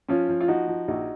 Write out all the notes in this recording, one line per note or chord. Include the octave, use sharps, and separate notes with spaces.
F3 C#4 F4
F3
F4
F3 D#4 F#4
F3
A#1 D#4 F#4